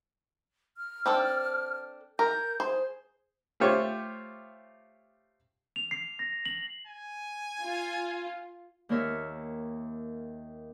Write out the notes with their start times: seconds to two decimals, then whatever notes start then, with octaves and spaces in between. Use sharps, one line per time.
0.77 F6
1.06 C4 D4 A4
2.19 A#4 G6
2.60 G#4 C5
3.60 A3 F4 G4 C5 C#5
5.76 F7
5.91 C7
6.19 A#6
6.45 F#7
6.87 G#5
7.62 F4
8.89 D#2 A#3 A#4 C#5 E5 F6